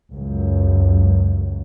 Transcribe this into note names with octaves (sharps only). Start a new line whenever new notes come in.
C#2 F#2